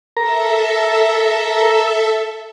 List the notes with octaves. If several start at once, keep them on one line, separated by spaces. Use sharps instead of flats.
A4 A#4 E5 A#5